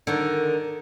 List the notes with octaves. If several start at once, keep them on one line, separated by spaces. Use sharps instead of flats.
D3 D#3